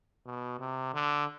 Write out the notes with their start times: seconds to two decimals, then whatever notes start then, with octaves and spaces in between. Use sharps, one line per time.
0.25 B2
0.59 C3
0.94 D3